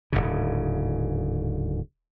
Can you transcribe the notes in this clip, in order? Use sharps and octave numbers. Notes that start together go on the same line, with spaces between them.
D1 G1 G#2 C#3